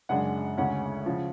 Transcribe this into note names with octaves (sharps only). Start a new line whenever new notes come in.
F#2 C#3 G#3 D4 F#5
D2 C#3 G#3 C#4 F#5
C#3 F3